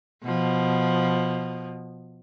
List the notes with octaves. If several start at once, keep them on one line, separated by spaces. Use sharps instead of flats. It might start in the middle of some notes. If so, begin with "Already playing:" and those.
B2 F3